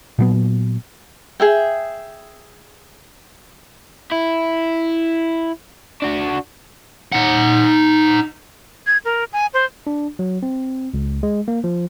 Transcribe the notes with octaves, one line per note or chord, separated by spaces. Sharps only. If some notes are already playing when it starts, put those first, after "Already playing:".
A#2 F#3 B3
G#4 E5 G5
E4
D4 F#4
D#4 F#5
G#6
A#4
G#5
C5
D4
F#3
C4
C#2
G#3
A#3
F3